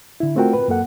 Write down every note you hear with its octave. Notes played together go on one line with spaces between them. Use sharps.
D3 E4
A3 C4 F4 F#4 A#4 G5
B4
F#2 A#3 A4 F#5